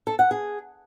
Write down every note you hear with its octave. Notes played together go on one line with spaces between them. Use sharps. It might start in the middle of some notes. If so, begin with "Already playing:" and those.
A4
F#5
G#4